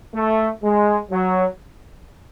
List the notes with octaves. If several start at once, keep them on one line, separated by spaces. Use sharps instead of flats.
A3
G#3
F#3